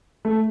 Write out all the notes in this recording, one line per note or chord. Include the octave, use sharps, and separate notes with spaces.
A3